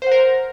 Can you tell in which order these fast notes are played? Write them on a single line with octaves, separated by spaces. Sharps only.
C5 F#5 A#4